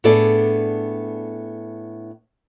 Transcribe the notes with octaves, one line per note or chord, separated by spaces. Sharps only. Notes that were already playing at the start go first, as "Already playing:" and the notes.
A2 B3 D4 G#4 A4 D5